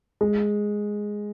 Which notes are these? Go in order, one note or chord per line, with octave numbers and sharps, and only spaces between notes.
G#3